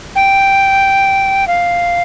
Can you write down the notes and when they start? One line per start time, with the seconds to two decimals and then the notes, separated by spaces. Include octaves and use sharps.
0.16 G5
1.48 F5